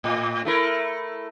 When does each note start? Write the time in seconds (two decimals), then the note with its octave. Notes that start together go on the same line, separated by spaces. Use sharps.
0.04 A2
0.45 A3 E4 A#4